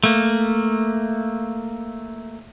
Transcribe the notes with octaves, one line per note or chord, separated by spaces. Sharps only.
A3 A#3